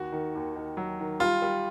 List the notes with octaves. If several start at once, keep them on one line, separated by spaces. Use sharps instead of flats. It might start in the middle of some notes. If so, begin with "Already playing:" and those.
Already playing: D#2 F#4
D#3
D#2
D#3
F#3
D#3
G3 F4
G3